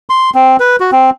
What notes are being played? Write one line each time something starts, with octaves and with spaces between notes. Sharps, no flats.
C6
C4
B4
F#4
C4